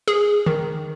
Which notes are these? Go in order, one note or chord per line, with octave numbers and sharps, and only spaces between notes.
G#4
D#3